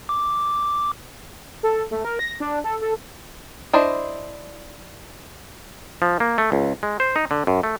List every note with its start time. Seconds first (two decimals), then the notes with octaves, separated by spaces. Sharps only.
0.09 D6
1.63 A4
1.91 A3
2.05 A#4
2.19 A#6
2.40 D4
2.64 A4
2.81 A4
3.73 D4 E4 C5 D#5
6.02 F3
6.20 A#3
6.38 A3
6.52 C#2
6.83 G#3
7.00 C5
7.16 D#4
7.31 D3
7.47 F#2
7.63 A3